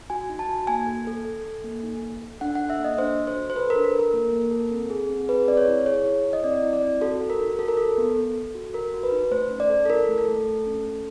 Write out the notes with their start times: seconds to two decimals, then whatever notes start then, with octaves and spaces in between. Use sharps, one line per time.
0.10 F#4 G#5
0.30 D#4
0.39 A5
0.49 F#4
0.67 A#3 G#5
0.87 A4
1.07 A4
1.25 A4
1.44 A4
1.64 A#3
1.83 D#4
2.02 D#4
2.22 A4
2.41 D4 F#5
2.55 A4 F#5
2.70 E5
2.79 A#3
2.84 D#5
2.98 D4 C5
3.18 A4
3.27 C5
3.36 F#4
3.50 C5
3.55 A4 B4
3.70 D4 A#4
3.84 A#4
3.95 A4 A#4
4.14 A#3
4.32 A#3
4.51 A4
4.71 C4
4.90 G#4
5.09 C4
5.29 G#4 B4
5.48 C4 D5
5.57 C#5
5.67 E4
5.86 G#4 C#5
6.05 E4
6.25 E4
6.33 D#5
6.44 C4 D5
6.63 E4
6.73 D5
6.83 C4
7.01 F#4 A4
7.21 F#4
7.30 A#4
7.40 D#4
7.59 F#4 A4
7.68 A#4
7.77 A4
7.98 B3
8.17 A4
8.35 A4
8.55 F#4
8.74 F#4 A#4
8.94 F#4
9.03 B4
9.12 D#4
9.31 A3 C5
9.51 C#4
9.60 D5
9.70 A4
9.85 A4
9.89 E4 A#4
10.09 A3
10.18 A4
10.28 A3
10.47 A3
10.66 C#4
10.85 A4